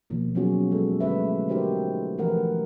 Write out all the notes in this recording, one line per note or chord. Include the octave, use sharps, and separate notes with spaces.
B2 D#3 F3 A#3
F#3 B3 C#4 F4 F#4 G#4
G#3 A4
D3 G#3 A3 C#4 B4 E5
D#4 F#4 G4 A#4 C5
E3 F3 A3 A#4 B4 F#5